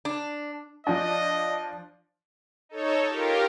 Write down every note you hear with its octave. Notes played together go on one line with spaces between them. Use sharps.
D4
F3 D4 D#5
D#4 A4 C#5
F4 G4 A#4